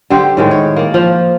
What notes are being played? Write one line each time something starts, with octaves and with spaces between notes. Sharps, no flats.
D3 G4 C5
A2 D#3 G#3
C#5
A#3 D5
F3